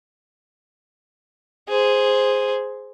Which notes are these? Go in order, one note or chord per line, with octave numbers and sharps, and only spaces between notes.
G#4 C5